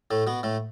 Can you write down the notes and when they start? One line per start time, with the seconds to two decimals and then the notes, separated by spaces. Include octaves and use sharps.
0.11 A2 A3
0.27 B2 B3
0.43 A2 A3